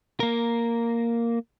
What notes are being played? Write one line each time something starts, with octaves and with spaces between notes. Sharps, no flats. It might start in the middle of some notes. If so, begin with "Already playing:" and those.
A#3 A#4